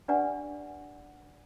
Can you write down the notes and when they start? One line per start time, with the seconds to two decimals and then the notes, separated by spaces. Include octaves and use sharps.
0.08 D4 G4 B4 D5 F#5 G#5